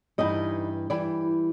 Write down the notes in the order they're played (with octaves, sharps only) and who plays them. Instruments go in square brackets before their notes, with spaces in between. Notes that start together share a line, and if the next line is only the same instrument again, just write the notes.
[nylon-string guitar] G2 E3 G3 D#4 D#5
E3 G3 D5